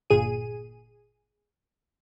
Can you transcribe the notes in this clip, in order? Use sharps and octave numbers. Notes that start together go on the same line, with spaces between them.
G1 A#2 G#4 D#7